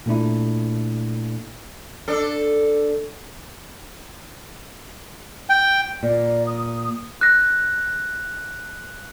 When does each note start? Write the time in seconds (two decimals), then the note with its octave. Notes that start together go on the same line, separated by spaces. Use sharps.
0.06 A#2 A3 D4 E4
2.08 D4 A4
5.50 G5
6.03 A#2 D5
6.47 D#6
7.21 F#6 A#6